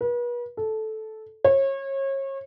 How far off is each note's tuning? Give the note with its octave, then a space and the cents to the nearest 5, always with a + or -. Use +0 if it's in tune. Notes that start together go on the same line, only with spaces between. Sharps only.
B4 -40
A4 -10
C#5 -30